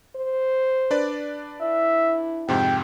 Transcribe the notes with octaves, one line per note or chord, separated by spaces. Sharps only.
C5
D4 B4 D5
E4 E5
F2 G#2 C3 G5